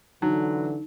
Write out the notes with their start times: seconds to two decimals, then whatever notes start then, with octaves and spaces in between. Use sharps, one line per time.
0.22 D3 E3 F#3 D#4